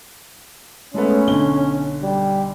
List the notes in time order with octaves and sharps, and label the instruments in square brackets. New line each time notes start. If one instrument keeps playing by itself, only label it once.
[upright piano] G#3 A3 B3 [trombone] C#4
[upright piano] B1 D3 G7
[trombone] G3